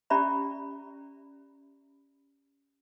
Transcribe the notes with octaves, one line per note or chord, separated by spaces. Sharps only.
C#4 G4 D5 E5 A#5 B5